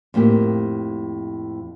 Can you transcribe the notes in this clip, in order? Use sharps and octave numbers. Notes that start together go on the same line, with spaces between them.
F2 A2 A#3 G4